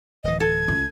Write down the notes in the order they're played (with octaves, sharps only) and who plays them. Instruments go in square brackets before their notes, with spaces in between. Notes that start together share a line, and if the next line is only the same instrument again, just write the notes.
[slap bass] D1 E3 [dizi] D#5
[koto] A4 [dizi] G#6
[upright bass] C#2